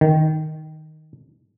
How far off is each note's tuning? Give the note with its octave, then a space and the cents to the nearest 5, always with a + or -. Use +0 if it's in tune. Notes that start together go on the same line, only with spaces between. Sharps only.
D#3 +0